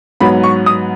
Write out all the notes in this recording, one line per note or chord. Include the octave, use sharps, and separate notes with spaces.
G#2 F#3 B3 B5
C#6
D#6